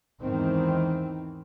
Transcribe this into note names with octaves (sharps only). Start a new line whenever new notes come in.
E2 G#2 D#3 E3 C4